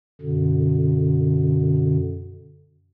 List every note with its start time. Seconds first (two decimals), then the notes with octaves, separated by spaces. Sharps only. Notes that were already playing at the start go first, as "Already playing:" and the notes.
0.21 F#2 B2 D3